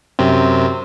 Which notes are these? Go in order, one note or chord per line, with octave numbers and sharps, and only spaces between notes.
F#2 C3 C4